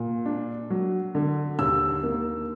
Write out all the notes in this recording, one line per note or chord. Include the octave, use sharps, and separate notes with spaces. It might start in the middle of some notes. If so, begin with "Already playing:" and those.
Already playing: A#2
D4
F#3
D3
D#2 E6
A#3